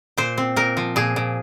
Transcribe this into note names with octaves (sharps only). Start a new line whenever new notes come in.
A#2 C5
C4
A#2 A#4
F3
A#2 G#4
A#2